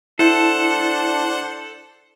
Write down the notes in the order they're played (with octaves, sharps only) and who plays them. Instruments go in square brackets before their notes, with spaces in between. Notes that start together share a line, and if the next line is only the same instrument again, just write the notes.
[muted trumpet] D4 [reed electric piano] E4 [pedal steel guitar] A4 [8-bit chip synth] C5 F#5